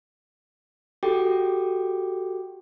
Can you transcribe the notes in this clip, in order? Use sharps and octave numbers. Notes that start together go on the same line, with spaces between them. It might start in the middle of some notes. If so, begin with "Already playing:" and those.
F#4 G4 A4 G5 D6